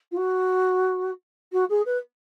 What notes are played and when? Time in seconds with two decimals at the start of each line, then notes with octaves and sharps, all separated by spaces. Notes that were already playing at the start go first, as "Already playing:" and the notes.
0.11 F4
0.16 F#4
1.52 F#4
1.69 G#4
1.85 B4